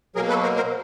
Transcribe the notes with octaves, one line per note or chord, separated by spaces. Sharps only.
B2 F#3 A#3 G#4 A#4
A4 B4
A#4 C5
A#4 C5